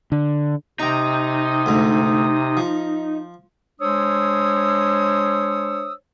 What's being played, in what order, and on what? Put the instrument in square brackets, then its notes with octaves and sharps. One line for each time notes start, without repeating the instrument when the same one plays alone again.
[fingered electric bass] D3
[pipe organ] C3 D#6 [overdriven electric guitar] D#4 [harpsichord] G5 A#5
[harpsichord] D2 G#2
F3
[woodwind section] G#3 D4 C5 C#5 D#6 E6